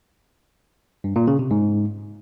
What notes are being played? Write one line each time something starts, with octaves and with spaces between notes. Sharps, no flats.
G2
A#2
C#3
C3
G#2